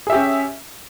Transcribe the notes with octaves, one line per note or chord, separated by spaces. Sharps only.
C#4 G4 G#4 E5